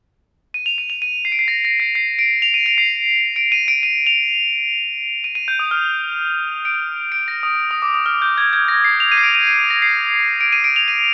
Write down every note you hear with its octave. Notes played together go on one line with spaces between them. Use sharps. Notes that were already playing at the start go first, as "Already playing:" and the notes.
D#7
F7
D#7
F7
D#7
C7
D7
C7
A#6
A#6
C7
C7
D7
F7
D#7
D7
C7
D7
D#7
D7
D#7
F7
D#7
D#7
G6
D#6
F6
D7
D7
A#6
D#6
D#6
D6
D#6
F6
G6
G#6
G#6
A#6
C7
F7
D#7
C7
D7
D#7
D#7
A#6
C7
D7
D#7
D7
F7
D#7